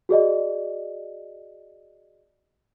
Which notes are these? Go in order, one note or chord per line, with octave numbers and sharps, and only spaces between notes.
F#4 G#4 D5 D#5